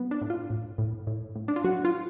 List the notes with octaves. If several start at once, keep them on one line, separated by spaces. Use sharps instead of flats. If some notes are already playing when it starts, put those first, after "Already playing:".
Already playing: F#3 B3
D4
A2
F4
A2
A2
A2
A2
D4
F4
F#3 F#4
F4